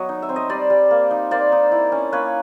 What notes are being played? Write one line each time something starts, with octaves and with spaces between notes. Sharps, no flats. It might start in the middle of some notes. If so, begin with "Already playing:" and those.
Already playing: F#3 B3 C#5 D#5
D#4
E5
C4
D#5
G3 C5 D5
G3
A#3
D#4
A#3 C5 D5
D#4
E4
C#4
A#3 B4 C#5